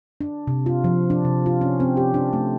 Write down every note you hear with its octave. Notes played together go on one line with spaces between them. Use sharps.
D4
C3
F4
F3
D4
C3
F4
C#4
C4
G4
D4
A3